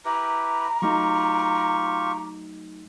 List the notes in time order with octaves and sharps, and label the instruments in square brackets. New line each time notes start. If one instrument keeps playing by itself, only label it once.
[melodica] E4 G4 B4 [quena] A#5
[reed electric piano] F#3 A3 D#4 [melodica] F4 G4 C#6